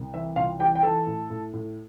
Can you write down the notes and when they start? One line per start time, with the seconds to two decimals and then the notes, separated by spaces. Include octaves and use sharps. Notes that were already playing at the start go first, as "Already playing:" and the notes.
Already playing: C2
0.14 E3 E5
0.36 C2 F4 F5
0.59 E3 G4 G5
0.75 G5
0.83 E3 A4 A5
1.07 A2
1.30 A2
1.53 A2